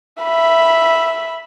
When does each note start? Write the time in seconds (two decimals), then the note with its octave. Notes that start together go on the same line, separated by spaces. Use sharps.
0.23 E5 B5